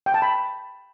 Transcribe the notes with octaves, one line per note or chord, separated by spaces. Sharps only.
G5
A5
B5